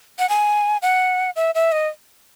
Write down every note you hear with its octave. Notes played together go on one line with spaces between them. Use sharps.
F#5
G#5
F#5
E5
E5
D#5